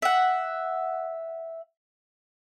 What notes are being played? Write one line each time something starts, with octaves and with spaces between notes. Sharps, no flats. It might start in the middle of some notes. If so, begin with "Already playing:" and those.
E5 F#5